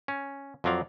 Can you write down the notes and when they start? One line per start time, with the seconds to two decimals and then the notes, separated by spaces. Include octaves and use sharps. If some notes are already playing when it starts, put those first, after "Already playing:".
0.08 C#4
0.64 F2 F3 F#3 D5 F5